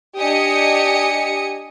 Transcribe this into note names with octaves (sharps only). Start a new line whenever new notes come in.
D4 G4 D#5 G#5 D#6 C#7